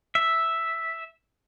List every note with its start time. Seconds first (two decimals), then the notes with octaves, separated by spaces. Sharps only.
0.15 E5